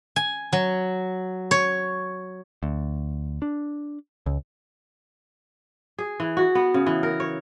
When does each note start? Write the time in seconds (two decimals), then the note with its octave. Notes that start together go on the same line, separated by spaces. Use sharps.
0.16 G#5
0.53 F#3
1.51 C#5
2.63 D2
3.42 D4
4.26 C#2
5.98 G#4
6.20 E3
6.37 F#4
6.55 B3
6.74 C#3
6.86 E3
7.03 A#4
7.20 C#5